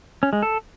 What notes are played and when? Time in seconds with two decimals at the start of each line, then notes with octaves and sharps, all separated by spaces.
0.23 C#4
0.33 G#3
0.43 A4